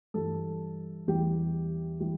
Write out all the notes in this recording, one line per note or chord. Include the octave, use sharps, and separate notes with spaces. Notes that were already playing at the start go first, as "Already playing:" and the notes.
G2 E3 G3 A4
E2 E3 G3 G4
E3 G3